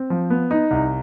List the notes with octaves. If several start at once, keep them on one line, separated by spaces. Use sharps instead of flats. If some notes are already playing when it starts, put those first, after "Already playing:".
Already playing: C4
F3
B3
D#4
C2